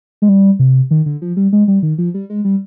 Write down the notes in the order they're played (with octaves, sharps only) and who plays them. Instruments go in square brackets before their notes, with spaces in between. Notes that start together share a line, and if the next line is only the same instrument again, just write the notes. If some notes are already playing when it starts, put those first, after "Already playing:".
[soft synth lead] G#3
G3
C3
D#3
D3
F3
G3
G#3
G3
D#3
F3
G3
G#3
G3